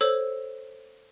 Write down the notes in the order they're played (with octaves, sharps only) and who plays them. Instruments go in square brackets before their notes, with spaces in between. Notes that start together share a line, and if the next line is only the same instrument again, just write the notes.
[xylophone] A4 C5 C#5 E6